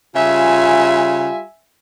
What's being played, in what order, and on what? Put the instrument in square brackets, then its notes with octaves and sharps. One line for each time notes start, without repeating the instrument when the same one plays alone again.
[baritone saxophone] C#3 [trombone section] G3 F4 [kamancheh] E5 G#5